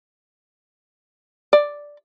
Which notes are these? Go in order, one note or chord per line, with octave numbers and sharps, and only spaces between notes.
D5